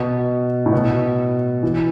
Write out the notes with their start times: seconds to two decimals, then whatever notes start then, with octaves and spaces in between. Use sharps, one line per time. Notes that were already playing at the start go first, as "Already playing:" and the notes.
Already playing: B2
0.66 A2
0.73 B2
1.63 E3